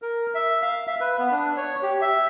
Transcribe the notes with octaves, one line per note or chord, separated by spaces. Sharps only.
A#4
E5
F5
E5
B4
B3
D4
C#5
G4
E5